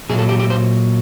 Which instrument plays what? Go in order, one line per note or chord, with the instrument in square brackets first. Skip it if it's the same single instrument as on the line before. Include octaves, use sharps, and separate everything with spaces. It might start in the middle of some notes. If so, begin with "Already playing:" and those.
[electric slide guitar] A#2 F#3 G#4
A4
G4
G4
C5